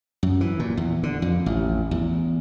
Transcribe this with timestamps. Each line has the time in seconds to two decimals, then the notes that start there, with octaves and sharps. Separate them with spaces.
0.23 F#2
0.41 E3
0.59 A#2
0.77 E2
1.03 D3
1.22 F2
1.46 A1
1.91 E2